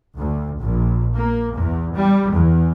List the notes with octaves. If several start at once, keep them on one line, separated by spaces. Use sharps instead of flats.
D2
A#1
A#3
E2
G3
E2